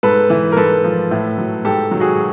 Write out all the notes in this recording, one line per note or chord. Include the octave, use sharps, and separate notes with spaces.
G#2 A4 B4
E3
A#4
G#2 A4 B4
F3
A2
F#3
G#2 G4 A4
D#3 F#3
F#4 G#4